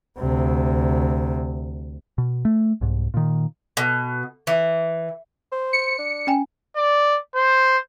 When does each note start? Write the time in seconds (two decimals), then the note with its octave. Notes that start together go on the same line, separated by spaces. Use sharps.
0.18 D2 C3
2.18 B2
2.45 A3
2.81 C2 G#2
3.14 A#2 D#3
3.77 B2
4.47 E3
5.52 C5
5.73 C#7
5.98 D4
6.27 C#4 G5 G#5
6.76 D5
7.35 C5